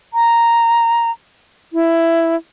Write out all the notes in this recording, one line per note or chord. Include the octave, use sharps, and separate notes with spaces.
A#5
E4